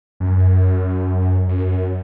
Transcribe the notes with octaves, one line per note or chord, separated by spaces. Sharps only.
F#2
F#2